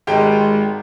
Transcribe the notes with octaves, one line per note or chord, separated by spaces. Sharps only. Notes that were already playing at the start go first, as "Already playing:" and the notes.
G#1 G#3 G4 G5